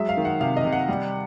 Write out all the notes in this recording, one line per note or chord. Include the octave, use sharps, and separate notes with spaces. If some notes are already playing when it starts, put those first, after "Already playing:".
Already playing: F#3 G#3 E5
F5
D#3
F#5
C3 F5
D#5
C3
F#5
G3